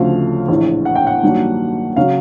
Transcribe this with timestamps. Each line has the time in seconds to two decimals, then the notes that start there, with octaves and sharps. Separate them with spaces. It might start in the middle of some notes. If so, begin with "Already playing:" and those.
Already playing: D2 C#3 F3 A3 C4 F5
0.48 A#1 A2 E3
0.85 F#5
0.96 G5
1.07 F#5
1.23 G2 D#3 F#3 A#3 D4
1.96 C#3 F#3 F5